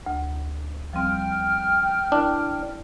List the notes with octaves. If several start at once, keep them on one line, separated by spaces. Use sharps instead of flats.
D2
F3 G3 C4 G5 F6
D4 E4 A#4